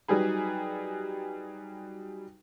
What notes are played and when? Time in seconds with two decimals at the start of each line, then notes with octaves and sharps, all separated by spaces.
0.08 F#3 G3 D#4 G#4 B4